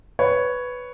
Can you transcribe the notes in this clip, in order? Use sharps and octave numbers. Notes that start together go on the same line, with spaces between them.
B4 C#5